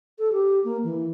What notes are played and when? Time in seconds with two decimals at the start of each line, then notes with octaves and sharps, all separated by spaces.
0.19 A4
0.32 G4
0.64 A#3
0.84 E3